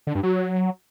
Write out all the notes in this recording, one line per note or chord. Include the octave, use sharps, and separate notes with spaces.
D3
G2
F#3